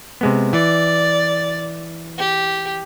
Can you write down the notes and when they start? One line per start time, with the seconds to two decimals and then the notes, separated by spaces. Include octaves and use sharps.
0.21 C3 G#3 B3
0.53 E3 D5
2.18 G4